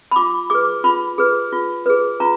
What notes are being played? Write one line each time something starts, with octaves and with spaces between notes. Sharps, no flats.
B5
F4 D6
G#4 B4 D6
F4 B5
G#4 B4
F4
G#4 B4
F4 A#5